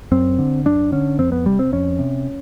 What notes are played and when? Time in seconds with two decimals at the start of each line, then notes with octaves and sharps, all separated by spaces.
0.12 F#2 C4
0.38 D3
0.65 F#2 D4
0.92 D3 C#4
1.18 F2 C4
1.32 B3
1.45 C3 G3
1.59 C4
1.73 F2 C#4
1.99 C3